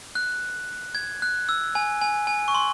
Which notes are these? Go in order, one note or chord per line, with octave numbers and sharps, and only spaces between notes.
F#6
G#6
F#6
E6
G#5
G#5
G#5
C#6
C6